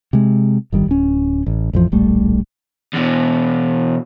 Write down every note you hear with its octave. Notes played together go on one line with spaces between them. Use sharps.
C3 G#3
G1 D#3 G3
D1 C#4
A1
A1 F2 E3 F3
D1 A#1 G3 A3
E2 B2